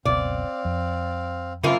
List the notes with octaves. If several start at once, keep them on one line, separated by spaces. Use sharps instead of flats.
F#1 C#2 B2 C4 D5 F5
F2
F#2 C#3 A#3 C4 F4 B5